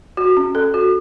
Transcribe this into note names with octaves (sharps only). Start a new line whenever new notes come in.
F#4
C#4
A4
F#4